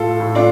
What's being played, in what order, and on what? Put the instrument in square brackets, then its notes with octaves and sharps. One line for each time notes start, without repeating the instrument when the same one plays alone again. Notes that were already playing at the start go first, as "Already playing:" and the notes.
Already playing: [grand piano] A2 F4 A4
A2
D4 F4